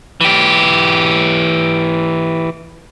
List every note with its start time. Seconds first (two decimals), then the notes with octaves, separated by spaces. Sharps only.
0.21 E3 G4